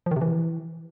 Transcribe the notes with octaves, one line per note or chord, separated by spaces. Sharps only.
F3
D#3
C3
E3